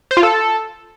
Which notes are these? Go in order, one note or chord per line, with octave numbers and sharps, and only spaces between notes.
C5
F4
A4